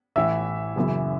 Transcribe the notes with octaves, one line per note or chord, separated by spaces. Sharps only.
A1 A2 E3 E5 E6
F#1 F#2 C#3 E3